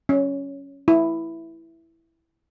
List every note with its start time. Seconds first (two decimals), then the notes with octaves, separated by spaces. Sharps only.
0.09 C#4
0.88 E4